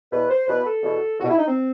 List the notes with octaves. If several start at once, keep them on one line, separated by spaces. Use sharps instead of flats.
E2 B2 B4
C5
E2 B2 B4
A4
E2 B2
E2 B2 F#4
E4
D#4
C4